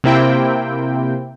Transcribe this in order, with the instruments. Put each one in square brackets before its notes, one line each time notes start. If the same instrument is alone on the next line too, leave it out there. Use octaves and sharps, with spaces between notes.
[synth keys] C3 A#3 C4 E4 G5